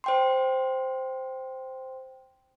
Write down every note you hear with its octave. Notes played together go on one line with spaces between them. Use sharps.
C5 G5 C6